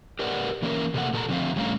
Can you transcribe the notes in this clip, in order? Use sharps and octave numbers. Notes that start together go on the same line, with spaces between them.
G4 A#4 B4 D5 E5 F#5
E3 A#3 C#4 E4 A#4
C3 A3 A#3 F#5
A#2 A4 C5 A#5
D3 F3 C4 C5 E5 F5
A2 G3 A3 C#4 F5 A#5